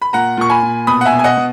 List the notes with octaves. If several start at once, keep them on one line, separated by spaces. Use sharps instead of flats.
B5
A#2 F#5 A#5
A#2 C#6
G#5 B5
A#2
B2 B5 D#6
F#5
E5 G#5
B2
G#5
D#5 F#5
B2